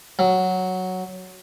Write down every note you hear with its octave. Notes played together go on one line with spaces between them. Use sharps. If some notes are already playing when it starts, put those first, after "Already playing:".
F#3